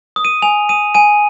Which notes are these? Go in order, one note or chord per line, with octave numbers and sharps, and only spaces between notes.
D#6
D#7
G#5 F7
D#6 D#7
G#5 D#7